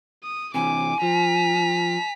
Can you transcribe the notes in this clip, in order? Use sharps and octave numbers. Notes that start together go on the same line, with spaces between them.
D#6
C3 E3 G#5 D6
F3 A#5 B6